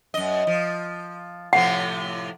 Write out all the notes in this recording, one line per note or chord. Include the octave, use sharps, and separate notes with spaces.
F#2 D#5
F3
A2 C3 F3 F#5